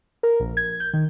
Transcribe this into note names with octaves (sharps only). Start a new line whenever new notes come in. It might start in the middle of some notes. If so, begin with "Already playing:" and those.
A#4
A#1
G#6
G6
D#3